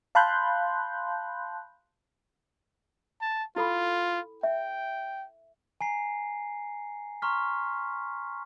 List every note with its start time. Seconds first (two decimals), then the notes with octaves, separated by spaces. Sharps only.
0.15 F5 A5 B5 C6 F#6 G6
3.21 A5
3.56 E4 F4 A4 B5
4.43 E5 G5
5.81 G#5 A#5 C7
7.22 A#5 C6 C#6 F6 B6